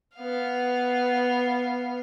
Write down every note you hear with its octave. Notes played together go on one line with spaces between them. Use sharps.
B3 F5